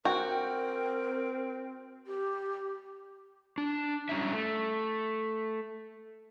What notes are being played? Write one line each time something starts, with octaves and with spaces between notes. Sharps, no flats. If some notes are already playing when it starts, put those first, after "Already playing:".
C4 F#4 A#4 G5
G4
D4
G3 C#4 D4 E4 E5
A3